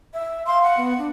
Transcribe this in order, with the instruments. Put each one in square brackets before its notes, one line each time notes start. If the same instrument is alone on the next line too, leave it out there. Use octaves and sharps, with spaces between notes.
[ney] E5
[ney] F5 [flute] C6
[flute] F#5
[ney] B3
D4